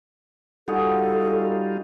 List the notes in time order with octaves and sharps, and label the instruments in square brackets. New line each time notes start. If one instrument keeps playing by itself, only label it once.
[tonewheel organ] G3 D#4 F4 [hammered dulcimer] F#4 G#4 [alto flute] A4